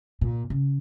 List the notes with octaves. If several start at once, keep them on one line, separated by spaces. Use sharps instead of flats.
A#2
C#3